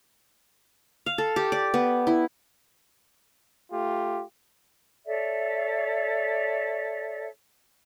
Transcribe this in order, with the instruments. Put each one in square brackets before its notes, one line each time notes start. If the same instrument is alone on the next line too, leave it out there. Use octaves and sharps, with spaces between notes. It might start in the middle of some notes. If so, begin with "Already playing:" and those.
[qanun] F5
A4
G4
D5
B3
E4
[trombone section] A3 F4 G4
[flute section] A4 C#5 D5 E5